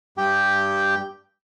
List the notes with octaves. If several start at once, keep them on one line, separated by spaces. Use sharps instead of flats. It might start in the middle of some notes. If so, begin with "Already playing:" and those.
G2 G4 G5